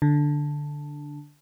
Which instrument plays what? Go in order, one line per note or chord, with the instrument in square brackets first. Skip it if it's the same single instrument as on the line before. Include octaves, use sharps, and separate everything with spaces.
[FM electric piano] D3